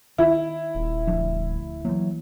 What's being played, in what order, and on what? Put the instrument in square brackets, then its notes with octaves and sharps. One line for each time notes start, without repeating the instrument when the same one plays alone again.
[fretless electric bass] D#3 [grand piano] E4
[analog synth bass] D#1
[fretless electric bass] D2 F3 D4
[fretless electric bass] E3 A#3 [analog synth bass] F#3